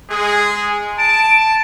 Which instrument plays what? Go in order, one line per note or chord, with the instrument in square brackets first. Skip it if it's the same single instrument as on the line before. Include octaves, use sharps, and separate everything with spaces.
[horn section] G#3 G#4
[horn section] A5 [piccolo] D7